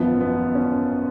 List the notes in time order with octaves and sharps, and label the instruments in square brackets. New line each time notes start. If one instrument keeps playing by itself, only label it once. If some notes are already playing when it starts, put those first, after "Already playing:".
Already playing: [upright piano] G#1 F#2 F3 [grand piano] B3
[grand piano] B3
C#4